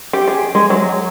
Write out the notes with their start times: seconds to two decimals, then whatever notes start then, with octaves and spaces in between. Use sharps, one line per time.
0.13 G4
0.28 G#4
0.55 G#3
0.70 F#3